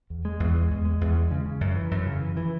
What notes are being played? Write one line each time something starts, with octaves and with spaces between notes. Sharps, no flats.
E2
G#3
E2
G#3
E2
G#3
E2
G#3
C#3
C#3
F#2
E3
F#2
C#3
E3
E3